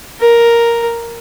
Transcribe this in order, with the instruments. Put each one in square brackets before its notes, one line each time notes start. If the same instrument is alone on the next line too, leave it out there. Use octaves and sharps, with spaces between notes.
[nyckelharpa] A#4